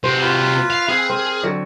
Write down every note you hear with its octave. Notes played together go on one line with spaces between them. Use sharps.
C3 F#4 C5
F4 B4
F5
C4 G#4 B4 F5
C4 A#4
D3 F#3